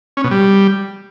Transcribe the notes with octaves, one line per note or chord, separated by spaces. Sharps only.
C#4
B2
G3